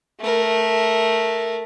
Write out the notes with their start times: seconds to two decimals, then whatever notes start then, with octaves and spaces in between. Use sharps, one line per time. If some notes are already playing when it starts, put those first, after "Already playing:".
0.20 A3 A#4